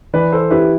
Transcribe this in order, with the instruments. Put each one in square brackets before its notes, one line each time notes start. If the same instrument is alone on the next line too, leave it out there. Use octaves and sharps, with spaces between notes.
[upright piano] E3 [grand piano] B4 D5
[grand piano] A4 C5
[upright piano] E4 [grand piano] G4 B4